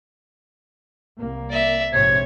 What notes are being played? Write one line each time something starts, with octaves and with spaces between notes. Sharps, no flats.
C2 A#3
D5 E5
A#1 G#2 C3 C#5 G#6